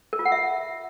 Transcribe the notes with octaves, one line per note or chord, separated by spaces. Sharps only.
A#4
F4
F#5
E5